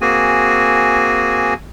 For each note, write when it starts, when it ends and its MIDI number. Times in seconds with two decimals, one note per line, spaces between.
0.01 1.54 58
0.01 1.54 60
0.01 1.54 66
0.01 1.54 68
0.01 1.54 80